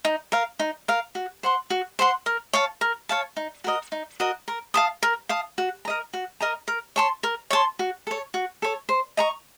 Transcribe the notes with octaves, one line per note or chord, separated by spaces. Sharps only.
D#4
A#4 F5
D#4
A#4 F5
F#4
C5 F#5 C6
F#4
C5 F#5 C6
A#4
C#5 F5 A5
A#4
C#5 F5 A5
D#4
F#4 A#4 D#5
D#4
F#4 A#4 D#5
A#4
F5 A5 D#6
A#4
F5 A5 D#6
F#4
A#4 D#5 A#5
F#4
A#4 D#5 A#5
A#4
C#5 A5 C6
A#4
C#5 A5 C6
F#4
A4 C#5
F#4
A4 C#5
C5
D#5 A#5 C#6